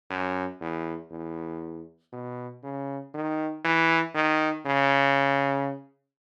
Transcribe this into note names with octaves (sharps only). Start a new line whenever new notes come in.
F#2
E2
E2
B2
C#3
D#3
E3
D#3
C#3